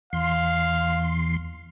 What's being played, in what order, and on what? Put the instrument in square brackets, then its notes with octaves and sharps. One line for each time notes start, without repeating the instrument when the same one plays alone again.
[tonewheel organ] E2 C6 [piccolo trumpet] F5